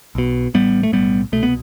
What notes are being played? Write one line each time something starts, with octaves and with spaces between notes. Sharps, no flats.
B1 B2
A1 A2 G3 B3
A3
B1 A2 G3 B3
C2 B2 A3
B3